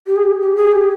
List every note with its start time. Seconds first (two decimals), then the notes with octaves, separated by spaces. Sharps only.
0.07 G4
0.16 G#4
0.23 G4
0.40 G4
0.55 G#4
0.72 G4